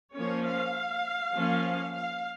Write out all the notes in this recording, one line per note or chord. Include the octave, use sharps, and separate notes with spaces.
F3 A#3 C#4 C#5
F5
F3 A#3 C#4
F5